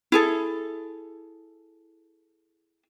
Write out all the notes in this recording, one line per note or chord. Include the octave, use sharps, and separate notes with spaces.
E4 G#4 A4